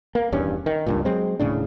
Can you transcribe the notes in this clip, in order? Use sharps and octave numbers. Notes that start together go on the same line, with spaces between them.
A#3
D#1 E2 G2 C#4
D#3
C#2 G2 A#2
F#3 G#3 C4
D#1 A2 C#3 D4